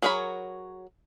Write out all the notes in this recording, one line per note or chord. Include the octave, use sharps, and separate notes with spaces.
F#3 G#4 A#4 C#5 B5